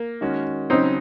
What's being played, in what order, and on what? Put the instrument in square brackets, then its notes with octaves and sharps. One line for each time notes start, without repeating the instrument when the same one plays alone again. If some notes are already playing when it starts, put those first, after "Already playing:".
Already playing: [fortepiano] A#3
[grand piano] D#3 G#3 C#4 F#4
[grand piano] C#3 F#3 C#4 [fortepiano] C4 D#4